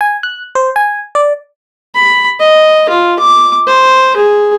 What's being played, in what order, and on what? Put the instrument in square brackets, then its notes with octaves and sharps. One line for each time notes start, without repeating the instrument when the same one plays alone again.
[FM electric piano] G#5
F#6
C5
G#5
D5
[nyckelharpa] B5
D#5
F4
D6
C5
G#4